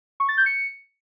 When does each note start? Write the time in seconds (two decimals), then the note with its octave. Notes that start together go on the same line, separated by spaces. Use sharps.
0.20 C#6
0.29 A6
0.37 G6
0.46 C#7